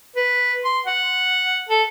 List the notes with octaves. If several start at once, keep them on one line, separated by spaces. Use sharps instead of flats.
B4
C6
F#5
A4